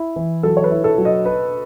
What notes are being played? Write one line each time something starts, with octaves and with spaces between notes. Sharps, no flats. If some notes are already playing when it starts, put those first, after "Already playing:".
Already playing: E4
E3
F#3 A4
C#5
B4
E4
A4
F#3
D#5
B4